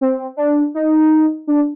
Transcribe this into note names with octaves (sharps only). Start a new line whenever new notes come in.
C4
D4
D#4
D4